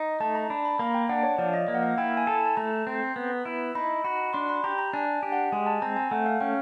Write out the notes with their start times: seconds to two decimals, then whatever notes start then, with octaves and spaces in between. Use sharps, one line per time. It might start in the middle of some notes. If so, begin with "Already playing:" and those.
Already playing: D#4
0.20 A3 A5
0.35 A#5
0.50 D4 B5
0.65 B5
0.79 A#3 A#5
0.94 G5
1.09 D4 F#5
1.23 C#5
1.38 F3 D5
1.53 D#5
1.68 A#3
1.75 F#5
1.83 F5
1.98 E4 G5
2.17 G#5
2.27 A4 A5
2.46 A5
2.57 A3 A#5
2.87 C4
3.16 B3
3.45 E4
3.75 D#4 B5
4.04 F#4 B5
4.33 D4 C6
4.49 B5
4.64 G4 A#5
4.78 A#5
4.93 D4 G#5
5.23 G4
5.32 F#5
5.52 G#3 G#5
5.66 A5
5.82 C4 A#5
5.96 G#5
6.11 A3 F#5
6.26 F5
6.40 C#4 G5